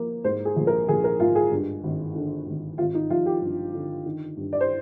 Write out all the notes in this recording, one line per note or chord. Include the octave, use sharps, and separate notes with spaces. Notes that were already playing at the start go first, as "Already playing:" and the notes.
Already playing: F3 A#3
G#2 C5
G#4
A#1
A#4
A#1 G#4
A#4
G#2 F4
G#4
G2
G#1
D3
G#1
G#1 F4
D#4
F3 F4
G4
G2
D3
D#3
G2
D5
C5